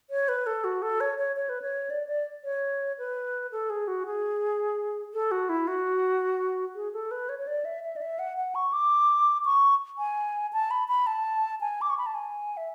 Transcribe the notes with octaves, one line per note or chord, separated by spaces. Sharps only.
C#5
B4
A4
F#4
A4
C#5
C#5
C#5
B4
C#5
D5
D5
C#5
B4
A4
G#4
F#4
G#4
A4
F#4
E4
F#4
G#4
A4
B4
C#5
C#5
D5
E5
E5
D5
E5
F#5
F#5
C#6
D6
C#6
G#5
A5
B5
B5
A5
G#5
D6
C#6
B5
A5
G#5
E5